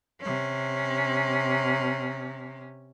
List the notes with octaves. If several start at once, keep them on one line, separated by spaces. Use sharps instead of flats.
C3 C#4